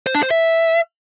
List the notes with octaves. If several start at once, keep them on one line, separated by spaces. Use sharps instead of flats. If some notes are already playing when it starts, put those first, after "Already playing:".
C5
D4
C5
E5